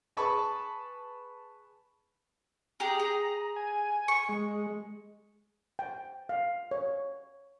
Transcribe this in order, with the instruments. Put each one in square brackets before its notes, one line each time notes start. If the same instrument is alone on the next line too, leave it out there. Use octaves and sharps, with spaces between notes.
[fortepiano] G#4 B4 A5 B5 C#6
[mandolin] G4 G#4 [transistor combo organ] A#5
[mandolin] G#4
[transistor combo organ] G#5
[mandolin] C#6
[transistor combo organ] G#3
[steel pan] G5
F5
C#5